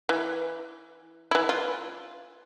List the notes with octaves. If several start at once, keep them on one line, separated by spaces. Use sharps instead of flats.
E3
E3 E4
F4